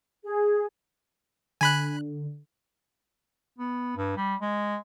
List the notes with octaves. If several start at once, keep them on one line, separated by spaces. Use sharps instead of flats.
G#4
D3 G#5 B5 F#6
B3
G2
G3
G#3